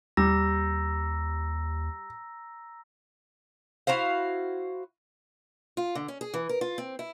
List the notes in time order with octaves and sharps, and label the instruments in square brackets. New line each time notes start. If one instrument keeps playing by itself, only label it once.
[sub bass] D#2 [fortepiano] G3 [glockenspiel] A#5 E6 A#6
[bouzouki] E4 F#4 C5 F5
[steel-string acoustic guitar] F4
D3
C#4
G#4
E3
A#4
F4
C4
E4